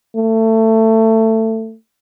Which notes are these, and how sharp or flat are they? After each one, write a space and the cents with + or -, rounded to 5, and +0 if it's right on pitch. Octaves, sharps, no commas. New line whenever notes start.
A3 +20